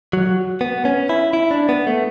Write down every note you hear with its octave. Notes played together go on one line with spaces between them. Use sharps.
F#3
B3
C#4
E4
E4
D4
B3
A3